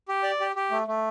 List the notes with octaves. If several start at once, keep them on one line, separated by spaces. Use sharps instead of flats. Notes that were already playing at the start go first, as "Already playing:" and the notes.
G4
D5
G4
G4
A3
A3